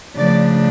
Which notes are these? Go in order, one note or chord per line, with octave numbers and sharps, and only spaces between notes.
C#3 F3 A3 D4 D5